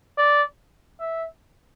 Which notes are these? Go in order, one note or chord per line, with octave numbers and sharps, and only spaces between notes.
D5
E5